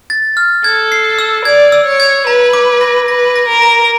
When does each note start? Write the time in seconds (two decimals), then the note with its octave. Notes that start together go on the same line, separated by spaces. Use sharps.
0.10 A6
0.37 F6
0.64 A4 G#6
0.92 C7
1.19 E6
1.45 D5 G#6
1.72 E6
1.86 C#5
2.00 G#6
2.27 B4 A#5
2.53 D6
2.81 A#6
3.08 B4 A#6
3.36 A#6
3.49 A#4
3.62 A#5